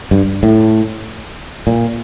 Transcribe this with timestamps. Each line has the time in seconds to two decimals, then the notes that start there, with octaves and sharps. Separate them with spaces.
0.11 G2
0.43 A2
1.67 A#2